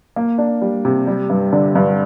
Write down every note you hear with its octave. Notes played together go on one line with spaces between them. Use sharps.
A#3
D4
G3
C3
G3
G2
D3
G2